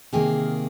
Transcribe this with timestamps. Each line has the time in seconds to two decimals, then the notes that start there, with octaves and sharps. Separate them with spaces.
0.13 C3 D#3 A#3 G#4